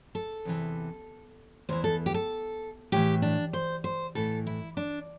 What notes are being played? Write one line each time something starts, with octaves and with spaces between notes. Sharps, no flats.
A4
E2 C3 E3
E2 E3 C5
A4
G4
A4
A2 E3 G4
D4
C5
C5
A2 E3 A4
E4
D4